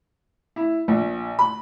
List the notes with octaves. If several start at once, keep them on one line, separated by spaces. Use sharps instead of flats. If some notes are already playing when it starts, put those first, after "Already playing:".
E4
A#1
B5